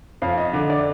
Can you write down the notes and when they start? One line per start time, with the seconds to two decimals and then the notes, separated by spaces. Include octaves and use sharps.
0.22 F2 F5
0.38 D#5
0.53 D3
0.70 D5